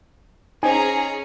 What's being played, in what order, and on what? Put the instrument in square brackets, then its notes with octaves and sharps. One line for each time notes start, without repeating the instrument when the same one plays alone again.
[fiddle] C#4 [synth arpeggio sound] D#4 C5 [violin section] G#4 A#5 [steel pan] G#5